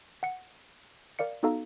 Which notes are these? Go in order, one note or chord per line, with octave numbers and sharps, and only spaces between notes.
F#5 C#7
A#4 D5 F5 C#7
B3 D#4 F#4 A4 F5 A#5